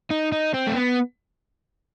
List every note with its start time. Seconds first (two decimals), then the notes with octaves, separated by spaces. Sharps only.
0.11 D#4
0.32 D#4
0.54 C4
0.67 A3
0.75 B3